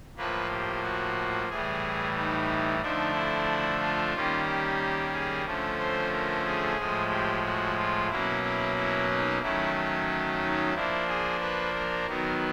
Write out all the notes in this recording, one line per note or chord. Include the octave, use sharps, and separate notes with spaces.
A2 F3 A#3 B4
G4
F#4
A2 E3 G3 G#4
D#4
D3 F3 A3 D4 D#4
E4
F4
D#3 G3 A#3 C#4
G4
G#4
D3 F3 A3 C#4
C5
A#4
G#4
A2 F3 G#3
G4
F#4
F4
B2 F#3 A#3 C#4 E4
E4
E4
D#4
D#3 F#3 A3 C#4 E4
D#4
F3 A#3 D4 E4
G#4
B4
A#4
D#3 F#3 B3